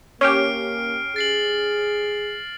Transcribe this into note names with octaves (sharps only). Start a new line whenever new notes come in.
A#3 C#4 G4 F6 C7 D7
G#4 A6 C7 F#7